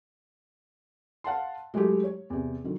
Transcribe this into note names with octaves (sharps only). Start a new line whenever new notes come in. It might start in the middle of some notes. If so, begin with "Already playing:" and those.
F5 F#5 A5 C6
F#3 G#3 A3 E4 G4
C#5
E2 C3
D3 D#3 F#3